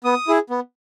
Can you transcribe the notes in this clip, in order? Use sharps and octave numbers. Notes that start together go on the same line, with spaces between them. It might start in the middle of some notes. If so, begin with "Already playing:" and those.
B3 D#6
E4 G#4
B3